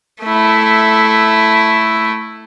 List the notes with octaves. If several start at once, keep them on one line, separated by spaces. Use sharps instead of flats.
A3 E4